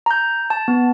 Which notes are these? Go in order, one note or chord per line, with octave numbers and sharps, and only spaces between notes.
A#5 G6
A5
B3